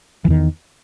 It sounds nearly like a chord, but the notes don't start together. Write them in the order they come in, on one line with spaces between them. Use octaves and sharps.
E3 E2 D#3